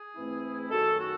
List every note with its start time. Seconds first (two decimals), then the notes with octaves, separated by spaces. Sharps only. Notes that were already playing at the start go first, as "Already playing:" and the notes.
Already playing: G#4
0.14 G#2 E3 A3 C4 E4
0.70 F#2 D#3 G#3 F#4 A4
0.98 F#4 A4